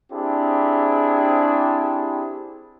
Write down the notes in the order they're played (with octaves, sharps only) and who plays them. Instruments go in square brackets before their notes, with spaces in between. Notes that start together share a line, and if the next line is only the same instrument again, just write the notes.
[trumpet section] C4 D4 E4 G4 G#4